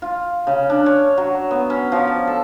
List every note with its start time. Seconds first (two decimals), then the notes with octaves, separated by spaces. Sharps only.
0.02 F4
0.47 C#3
0.70 D4
0.86 C#5
1.17 F#3
1.51 B3
1.70 C#4
1.92 F3
2.07 D5
2.27 A4